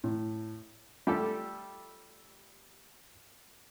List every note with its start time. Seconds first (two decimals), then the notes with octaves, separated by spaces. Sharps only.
0.04 A2
1.07 G3 A3 F4 G4 A4